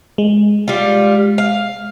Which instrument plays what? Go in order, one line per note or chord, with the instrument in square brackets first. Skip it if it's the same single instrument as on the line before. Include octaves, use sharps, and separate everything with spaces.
[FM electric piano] G#3
[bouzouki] G3 F4
F5